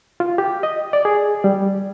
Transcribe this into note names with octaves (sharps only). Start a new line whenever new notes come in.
F4
G4
D#5
D5
G#4
G3